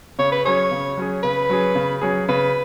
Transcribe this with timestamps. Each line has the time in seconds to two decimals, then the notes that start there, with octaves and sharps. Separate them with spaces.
0.19 C#3 C#5
0.32 B4
0.45 F#3 C#4 G#4 C#5
0.71 C#3
0.97 F#3 C#4 G#4
1.23 C#3 B4
1.49 F#3 C#4 G#4
1.75 C#3
2.02 F#3 C#4 G#4
2.29 C#3 B4